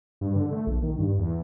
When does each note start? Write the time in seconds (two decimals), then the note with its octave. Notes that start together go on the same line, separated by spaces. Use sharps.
0.21 G2
0.36 D3
0.52 A3
0.67 A#1
0.83 D#3
0.99 G2
1.19 E2